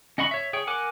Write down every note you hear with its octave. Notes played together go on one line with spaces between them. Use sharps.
C#4 D#5 F#5 B5 C#6
C#5 E5
G#4 C#5 G5
A#4 F#5 G#5 D6